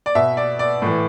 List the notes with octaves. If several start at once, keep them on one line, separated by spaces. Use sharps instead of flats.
D5
B2 E5
D5
D5
A2 E3